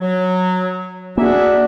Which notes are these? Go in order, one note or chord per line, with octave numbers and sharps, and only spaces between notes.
F#3
A#3 D4 F#4 G#4 E5